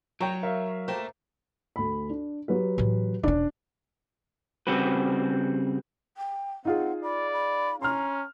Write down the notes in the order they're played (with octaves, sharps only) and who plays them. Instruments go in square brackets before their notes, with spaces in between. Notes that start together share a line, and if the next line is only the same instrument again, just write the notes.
[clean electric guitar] F#3 [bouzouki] C#5 [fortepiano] G5 A#5
[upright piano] A#4 E5 F5
[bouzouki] A3 A#3 A5 [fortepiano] C5 G5
[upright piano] D2 B5
D4
F#3 G4 B4
[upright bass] A2 E3
[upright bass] E1 C#4 [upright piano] D4 D5
[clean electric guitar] C#3 G3 C4 F#4 B4
[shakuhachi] G5
[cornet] C4 [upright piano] D#4 F4 G#4 [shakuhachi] F#5
[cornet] D5 [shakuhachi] B5
[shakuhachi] B5
[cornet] C#4 [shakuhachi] A#5 [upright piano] C6 F6